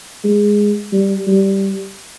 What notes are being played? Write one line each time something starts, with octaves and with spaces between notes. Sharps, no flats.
G#3
G3
G3